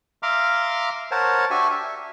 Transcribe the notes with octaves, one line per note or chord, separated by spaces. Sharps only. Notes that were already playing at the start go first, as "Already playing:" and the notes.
E5 F5 A#5 C6 D6 F6
A#4 C5 C#5 F#5 A5
D4 F#4 G4 E5 G#5 C#6
E5